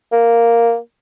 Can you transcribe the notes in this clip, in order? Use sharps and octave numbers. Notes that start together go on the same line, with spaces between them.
A#3